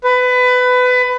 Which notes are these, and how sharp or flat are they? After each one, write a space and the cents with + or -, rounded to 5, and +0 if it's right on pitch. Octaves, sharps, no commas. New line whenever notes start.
B4 +20